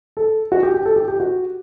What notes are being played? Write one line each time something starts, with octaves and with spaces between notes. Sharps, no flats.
A4
F#4
G4
G4
A4
G4
G4
F#4